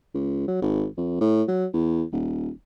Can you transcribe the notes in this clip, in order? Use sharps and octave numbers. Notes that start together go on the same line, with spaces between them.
C#2
F#3
G#1
F2
A2
F#3
E2
D#1